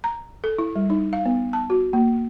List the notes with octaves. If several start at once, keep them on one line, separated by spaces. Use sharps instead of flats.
A#5
A4
E4
G3
D#4
F5
B3
A5
F#4
A#3